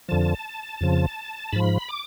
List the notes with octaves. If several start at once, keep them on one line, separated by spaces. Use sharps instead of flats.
F2 D3 F3 A5
F2 C#3 F3
G#2 F3 B5
D6